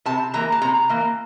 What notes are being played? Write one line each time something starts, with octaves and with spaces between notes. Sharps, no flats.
C3 A5
E3 A#3 A#5
A5
C3 A#5
E3 A#3